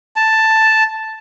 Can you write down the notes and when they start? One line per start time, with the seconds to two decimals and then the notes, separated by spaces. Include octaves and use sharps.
0.16 A5